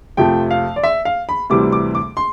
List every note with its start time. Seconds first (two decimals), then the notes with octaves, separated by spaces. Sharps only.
0.17 F2 C3 F3 A3 G5
0.51 F5
0.76 D5
0.83 E5
1.05 F5
1.29 B5
1.50 D2 C3 E3 G3 D6
1.72 D6
1.95 D6
2.17 C6